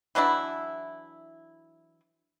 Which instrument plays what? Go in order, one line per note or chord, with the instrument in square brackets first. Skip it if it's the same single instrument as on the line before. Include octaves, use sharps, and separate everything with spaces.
[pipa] E3 F#3 D4 E4